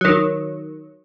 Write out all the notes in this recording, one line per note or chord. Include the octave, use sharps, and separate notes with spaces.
D#3 F#3